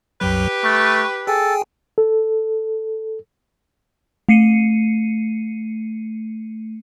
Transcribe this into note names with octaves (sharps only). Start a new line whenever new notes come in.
C2 F#2 F#3 G4 B4
A3 C#6
G#4 A4 G5 G#5
A4
A3 C7 C#7 D#7